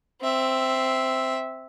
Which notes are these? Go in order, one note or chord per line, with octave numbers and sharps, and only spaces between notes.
C4 E5